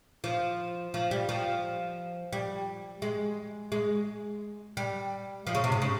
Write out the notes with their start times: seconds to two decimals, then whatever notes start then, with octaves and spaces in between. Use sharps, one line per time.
0.24 F3
0.94 F3
1.11 G3
1.29 F3
2.33 G3
3.02 G#3
3.72 G#3
4.77 G3
5.47 F3
5.55 C#3
5.64 C3
5.72 G#2
5.82 C#3